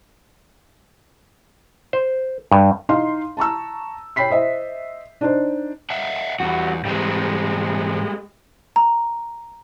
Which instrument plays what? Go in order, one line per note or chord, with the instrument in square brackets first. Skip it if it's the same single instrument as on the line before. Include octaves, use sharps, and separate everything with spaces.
[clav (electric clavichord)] C5
G2
[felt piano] D#4 F5 C6
A5 A#5 C#6 E6
C#5 G5 B5 B6 C7
C5 D#5 E5
D4 D#4 C5
[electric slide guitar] D#5 E5 F#5
[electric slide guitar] E2 [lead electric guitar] G3 F#4
[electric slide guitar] G#2 E3 C4 [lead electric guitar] G3 G#3
[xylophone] A#5